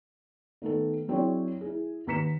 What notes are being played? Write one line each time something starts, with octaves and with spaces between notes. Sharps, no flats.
D#3 A3 B3 A4
F#3 C4 D4 E4 G#4 C#5
E4 G#4
D#2 B4 A#5 B6 C#7 E7